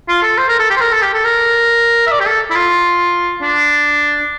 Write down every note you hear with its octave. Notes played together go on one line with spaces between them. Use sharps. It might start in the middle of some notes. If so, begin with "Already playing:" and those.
F4
A4
C5
A#4
A4
G4
C5
A#4
A4
G4
A4
A#4
E5
D5
G4
A4
E4
F4
D4